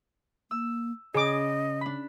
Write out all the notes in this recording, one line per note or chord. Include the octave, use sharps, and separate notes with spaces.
A#3 E6
C#3 C#4 G#4 D#5 D6
D4 B5 B6